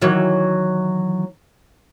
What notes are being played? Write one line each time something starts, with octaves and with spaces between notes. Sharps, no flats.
D#3 E3 F#3